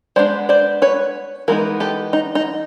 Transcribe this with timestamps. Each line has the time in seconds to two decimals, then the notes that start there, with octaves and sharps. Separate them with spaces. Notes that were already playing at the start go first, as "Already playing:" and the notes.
0.16 G#3 B3 D4 C5 D5
0.49 C5 D5
0.82 B4 C#5
1.48 E3 G#3 B3 D#4 A#4
1.80 G4 A4
2.13 D#4
2.35 D#4